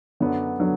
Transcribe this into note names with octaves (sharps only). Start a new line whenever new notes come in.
F#2 D3 F#3 B3 D4
D3 F#3 B3 D4